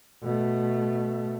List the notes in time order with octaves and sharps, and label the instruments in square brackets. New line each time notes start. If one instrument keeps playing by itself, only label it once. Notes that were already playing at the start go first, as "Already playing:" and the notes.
[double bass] B2 A3